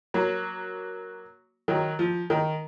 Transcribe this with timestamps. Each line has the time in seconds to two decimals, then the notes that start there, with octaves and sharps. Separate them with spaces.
0.14 F#3 A#3
1.68 D#3 F#3
1.99 F3
2.30 D#3